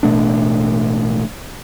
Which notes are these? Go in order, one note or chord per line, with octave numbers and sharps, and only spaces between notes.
A1 B2 A3 D4